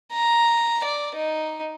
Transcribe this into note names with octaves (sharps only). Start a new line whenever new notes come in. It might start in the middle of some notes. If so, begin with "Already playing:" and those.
A#5
D5
D#4